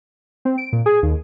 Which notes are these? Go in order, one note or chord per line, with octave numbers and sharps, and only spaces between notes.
C4
D7
A#2
G#4
D#2